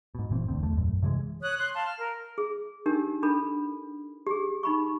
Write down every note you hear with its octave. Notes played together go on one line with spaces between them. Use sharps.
G#2 B2
F#1 A#2 E3 C4
E1 D2 C4
B1 E2 A3
A#1 F#2
C3 E3 F3 G#3
C#5 D#6 F#6
C6 F#6
F5 A5 C6
F6
A#4
G#4
D4 D#4 G4 A#4
D4 A4 A#4 B5
G4 G#4
D#4 B5 C#6